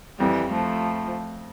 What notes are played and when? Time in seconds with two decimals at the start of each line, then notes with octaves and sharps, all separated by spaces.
0.19 F2 E3 G3
0.51 F3 A3